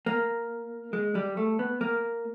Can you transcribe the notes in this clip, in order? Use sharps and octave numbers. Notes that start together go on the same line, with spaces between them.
A#3
G#3
G3
A3
B3
A#3